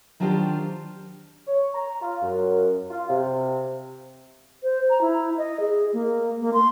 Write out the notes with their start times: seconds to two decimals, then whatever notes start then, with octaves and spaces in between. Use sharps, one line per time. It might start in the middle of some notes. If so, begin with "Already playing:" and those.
0.20 D#3 F#3 D4 F4 G4 C5
1.48 C#5
1.74 A#5
2.02 F4
2.22 F#2
2.90 F4
3.09 C3
4.63 C5
4.90 A#5
5.01 E4
5.38 D#5
5.60 G#4
5.93 A#3
6.41 A#3
6.54 C6